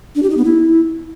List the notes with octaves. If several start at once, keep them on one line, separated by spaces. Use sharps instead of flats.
D4
G4
D#4
B3
E4